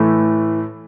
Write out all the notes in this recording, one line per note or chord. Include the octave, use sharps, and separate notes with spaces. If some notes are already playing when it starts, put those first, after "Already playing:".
Already playing: A2 E3 A3